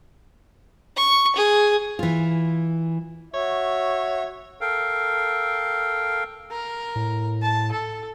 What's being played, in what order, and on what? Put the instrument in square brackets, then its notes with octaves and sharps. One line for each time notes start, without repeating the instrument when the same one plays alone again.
[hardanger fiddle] C#6
G#4
[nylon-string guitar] E3 F4
[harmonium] F#4 E5 [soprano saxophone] C#5
[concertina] A4 A#4 F5 G5
[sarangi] A#4
[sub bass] A2
[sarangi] A5
A4